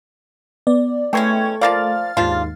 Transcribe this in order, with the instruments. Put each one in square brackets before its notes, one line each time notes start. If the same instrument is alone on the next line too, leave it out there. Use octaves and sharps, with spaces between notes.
[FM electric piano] B3 D5
[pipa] E3 G#3 C#4 [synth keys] A3 [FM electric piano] G5 C#6 G#6
[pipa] F3 A#3 D5 [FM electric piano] F5 F6 A6
[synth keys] D#2 G#2 [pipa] F3 D4 F4